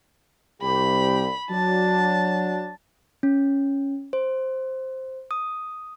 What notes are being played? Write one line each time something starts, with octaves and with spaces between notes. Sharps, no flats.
C2 G4 B5
F#3 D4 A5
C#4
C5
D#6